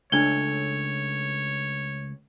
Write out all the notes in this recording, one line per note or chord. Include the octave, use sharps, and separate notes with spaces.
C#2 A3 D4 A4 C#5 G#6 G7